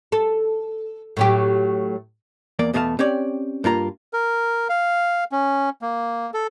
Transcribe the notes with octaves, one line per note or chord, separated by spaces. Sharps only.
A4
A2 F#3 G4
E2 A#3 D5
E2 B2 A3 G#4 F5 A5
C4 C#4 G4 C#5 D5
G2 A#3 F4 A#5
A#4
F5
C#4
A#3
A4